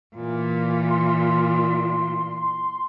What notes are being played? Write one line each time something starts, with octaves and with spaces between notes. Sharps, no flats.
A#2 E3
C6